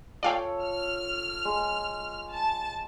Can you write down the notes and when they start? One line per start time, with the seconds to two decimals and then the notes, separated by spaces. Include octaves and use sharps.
0.23 F4 A4 C#5 D5 F5 G5
0.62 F6
1.45 G#3
2.31 A5